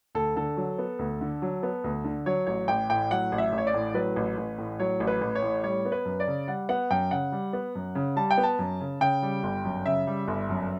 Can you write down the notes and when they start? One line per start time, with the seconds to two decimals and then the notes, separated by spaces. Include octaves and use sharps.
0.15 D2 A4
0.36 D3 A4
0.57 F#3
0.78 B3
0.99 D2
1.21 D3
1.42 F#3
1.63 B3
1.84 D2
2.04 D3
2.26 F#3 C#5
2.47 A1 C#5
2.68 A1 G5
2.90 A2 G5
3.11 F#3 F#5
3.32 A1
3.38 E5
3.53 A1
3.58 C#5
3.67 D5
3.74 A2
3.94 F#3 B4
4.16 A1
4.38 A1
4.58 A2
4.80 F#3 C#5
5.00 A1
5.07 B4
5.21 A1
5.35 C#5
5.42 A2
5.64 G3 C#5
5.85 B3
5.92 B4
6.05 F#2
6.20 D5
6.27 C#3
6.48 G3 F#5
6.69 B3 F#5
6.91 F#2 G5
7.11 C#3 F#5
7.32 G3
7.53 B3
7.75 F#2
7.95 C#3
8.16 G3 A5
8.31 G5
8.37 B3
8.43 A5
8.59 F#2
8.81 C#3
9.01 C#3 G5
9.22 G3
9.43 G1
9.64 F#2
9.85 C#3 E5
10.07 G3
10.28 G1
10.49 F#2